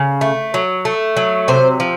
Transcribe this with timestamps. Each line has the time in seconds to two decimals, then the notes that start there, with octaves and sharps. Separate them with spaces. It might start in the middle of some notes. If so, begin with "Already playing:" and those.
Already playing: C#3
0.21 A3
0.54 F#3
0.85 A3
1.17 F#3
1.48 C3 C5
1.80 F3